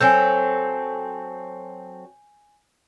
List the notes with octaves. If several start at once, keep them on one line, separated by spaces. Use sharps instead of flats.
F#3 C4 A4 G#5 G6